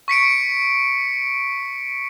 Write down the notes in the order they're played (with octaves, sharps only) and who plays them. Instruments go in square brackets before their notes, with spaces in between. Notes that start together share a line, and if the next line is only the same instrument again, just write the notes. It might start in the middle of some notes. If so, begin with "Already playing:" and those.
[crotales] C#6 B6 C#7 D7